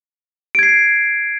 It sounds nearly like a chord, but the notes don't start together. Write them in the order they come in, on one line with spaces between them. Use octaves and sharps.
D7 G#6 C7